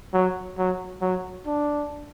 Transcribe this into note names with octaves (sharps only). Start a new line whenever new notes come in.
F#3
F#3
F#3
D4